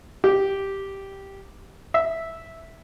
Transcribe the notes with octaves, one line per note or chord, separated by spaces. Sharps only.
G4
E5